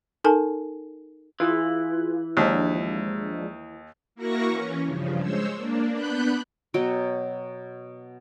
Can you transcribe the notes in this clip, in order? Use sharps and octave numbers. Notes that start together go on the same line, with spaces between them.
D#4 A4 A#4 G#5 A5
E3 F4 G#4
D#2 F3 G#3 D4
A#3 E4 F#4 A#4 C#6 A#6
E3 C#4
G2 C#3 F3
G#3 C5 C#5 E6
A#3 D4
B3 D4 B5 F#6 G6
B2 F#3 F#4 G5